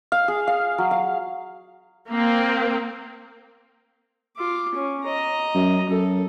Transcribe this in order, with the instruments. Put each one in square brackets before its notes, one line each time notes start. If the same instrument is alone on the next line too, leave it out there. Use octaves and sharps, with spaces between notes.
[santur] F5
G#4
F5
F#3
F5
[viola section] A#3 C4
[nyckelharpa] F4 D6
C#4
D#5 A#5
[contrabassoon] F#2
[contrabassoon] F#2 [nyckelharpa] A4